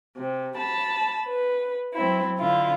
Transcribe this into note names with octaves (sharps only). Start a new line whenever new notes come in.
C3
A5 B5
B4
F#3 C4 E4
D3 E4 F4